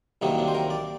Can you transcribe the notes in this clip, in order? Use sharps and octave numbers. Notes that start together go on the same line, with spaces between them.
C2 C3 D#3 F#3 A#3 D#4
D4
C5
A#4
D5